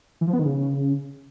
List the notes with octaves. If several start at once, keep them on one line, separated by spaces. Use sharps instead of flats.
E3
F3
B3
D#3
C#3